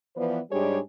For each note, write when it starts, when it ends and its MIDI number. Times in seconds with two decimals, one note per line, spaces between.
0.16 0.39 52
0.16 0.39 53
0.16 0.39 59
0.16 0.39 71
0.16 0.39 72
0.16 0.39 74
0.51 0.78 44
0.51 0.78 55
0.51 0.78 62
0.51 0.78 67
0.51 0.78 68
0.51 0.78 73